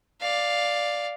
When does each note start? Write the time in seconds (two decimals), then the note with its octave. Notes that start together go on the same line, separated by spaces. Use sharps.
0.20 D5 F5